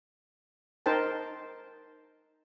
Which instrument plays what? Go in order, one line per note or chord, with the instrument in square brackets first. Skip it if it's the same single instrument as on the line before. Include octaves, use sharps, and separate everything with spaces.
[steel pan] D#4 A#4 C5 G5 A5